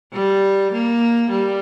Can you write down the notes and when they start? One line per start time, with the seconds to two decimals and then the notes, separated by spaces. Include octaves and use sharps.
0.13 G3
0.72 A#3
1.31 G3